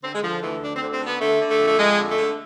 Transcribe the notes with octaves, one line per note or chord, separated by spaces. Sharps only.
D3 C4
G#3
D3 F3
D2 E3
D2 D4
C4
D3
C4
D3 B3
D3 A3
D3
A3
F2
A3
F2 G#3
D3
A3
D3